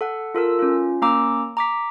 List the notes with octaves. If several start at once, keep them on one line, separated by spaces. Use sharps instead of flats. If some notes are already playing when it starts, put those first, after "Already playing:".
A4 F#5
F4 A4 A#4 E6
C#4 F4
A#3 C#4 A#5 D6 E6
A#5 D6 B6